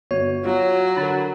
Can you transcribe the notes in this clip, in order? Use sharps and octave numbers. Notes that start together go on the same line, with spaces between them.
G1 F#4 C#5
F#3 F4
D3 A#4 B5 A6